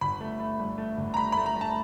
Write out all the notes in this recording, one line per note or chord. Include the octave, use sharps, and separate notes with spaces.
G1 B5
A3
A3
G2
A3
G1
A#5
A3 B5
A3 B5
A#5
A3 A5